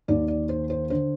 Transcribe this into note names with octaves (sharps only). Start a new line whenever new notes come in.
D#2 D#3 D5
D5
C5
C5
D3 C5